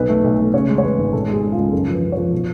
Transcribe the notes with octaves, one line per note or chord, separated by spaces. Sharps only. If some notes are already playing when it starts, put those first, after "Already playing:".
Already playing: B1 B4
A3
B1
A3
C#3 C#5
G#3
C#5
G#3 B4
G#1
B2 A4
G#3
G#4
G#3
F4
C#2
F#2 A4
F3 B4
F#2
F3 C#5
B2